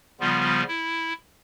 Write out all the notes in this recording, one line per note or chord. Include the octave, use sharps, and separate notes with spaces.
C#3 F3 G3 B3 F4
E4